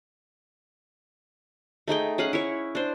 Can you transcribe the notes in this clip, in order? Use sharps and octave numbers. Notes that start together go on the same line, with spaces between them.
A3 D#4 G#4 G5
C#4 G#4 F5 F#5
E4 C#5
D4 C5